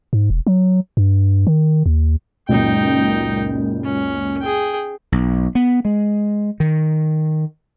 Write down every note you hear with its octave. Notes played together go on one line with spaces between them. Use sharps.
G#2
E1
F#3
G2
D#3
D#2
C#2 F#2 A#2 D#4 G5
C#4
G#4 G5
B1
B3
G#3
D#3